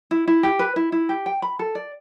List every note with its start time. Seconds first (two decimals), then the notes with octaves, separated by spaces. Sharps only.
0.11 E4
0.28 E4
0.43 G4
0.59 B4
0.76 E4
0.92 E4
1.09 G4
1.26 G5
1.42 B5
1.59 A4
1.75 D5